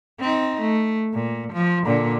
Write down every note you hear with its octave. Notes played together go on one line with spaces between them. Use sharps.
C4 D#4
A3
A#2
F3
A#2 D3